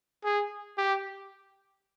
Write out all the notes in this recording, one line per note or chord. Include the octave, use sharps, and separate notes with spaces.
G#4
G4